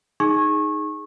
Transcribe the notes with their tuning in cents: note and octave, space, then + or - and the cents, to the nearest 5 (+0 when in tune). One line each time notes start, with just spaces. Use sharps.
D#4 +0 G#4 +0 C#6 -25